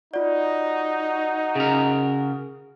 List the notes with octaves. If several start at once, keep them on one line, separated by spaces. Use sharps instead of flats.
D#4 F4 F#4 D5
C#3 G#4 A#4